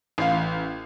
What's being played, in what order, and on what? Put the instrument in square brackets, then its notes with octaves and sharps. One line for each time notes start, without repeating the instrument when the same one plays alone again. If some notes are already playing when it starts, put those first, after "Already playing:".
[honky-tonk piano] A1 F5